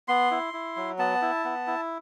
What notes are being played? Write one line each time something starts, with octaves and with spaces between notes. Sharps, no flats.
B3 C6
E4
E4
F#3
B3 A5
E4
B3
E4